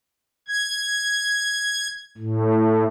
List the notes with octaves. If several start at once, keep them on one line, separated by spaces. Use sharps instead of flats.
G#6
A2